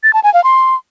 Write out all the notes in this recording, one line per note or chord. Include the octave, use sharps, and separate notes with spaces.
A6
A5
G#5
F5
C6